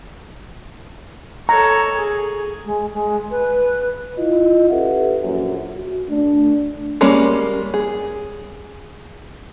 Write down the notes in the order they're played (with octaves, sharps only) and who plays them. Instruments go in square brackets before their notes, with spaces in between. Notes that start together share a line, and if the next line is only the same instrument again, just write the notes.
[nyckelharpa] A4 C#5 [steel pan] A#5
[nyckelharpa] G#4
[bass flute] G#3
G#3
B4
[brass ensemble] E4 F4 D#5
C#4 G4 A4 B4 E5 F#5
A#1 F#2
F#4
A3 D4
[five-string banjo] G3 G#3 A#3 C#4
G#4